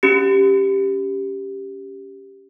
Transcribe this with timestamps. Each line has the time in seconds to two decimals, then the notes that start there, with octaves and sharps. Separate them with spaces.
0.03 C#4 G4 C#7